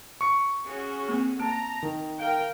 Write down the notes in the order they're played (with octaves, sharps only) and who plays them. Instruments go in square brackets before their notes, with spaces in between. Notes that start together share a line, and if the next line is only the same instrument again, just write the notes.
[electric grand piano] C#6 C#7
[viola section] C#4 F#4 G#4
[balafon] A#3 C4
[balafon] A#3 [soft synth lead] A5 [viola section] A#5 [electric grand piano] D7
[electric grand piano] D#3 [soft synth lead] A#4
[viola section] A#4 G5 [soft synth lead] F5